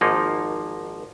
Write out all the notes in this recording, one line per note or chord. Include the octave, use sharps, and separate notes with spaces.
G#1 G#2 F3 A#3 D#4